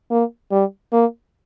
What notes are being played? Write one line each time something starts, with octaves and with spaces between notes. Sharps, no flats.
A#3
G3
A#3